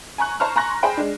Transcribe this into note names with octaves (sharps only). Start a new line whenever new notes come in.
G#5 A#5 C#6 F#6
C5 A5 A#5 C#6 F6
G#5 A#5 C6 C#6 F#6 A#6
G#4 C5 G5 B5
G#3 D4